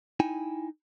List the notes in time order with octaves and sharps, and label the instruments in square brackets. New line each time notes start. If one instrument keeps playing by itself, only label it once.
[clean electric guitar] D#4 E4 G5 G#5